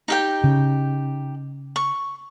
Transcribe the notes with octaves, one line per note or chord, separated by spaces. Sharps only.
D#4 G4 G5
C#3
C#6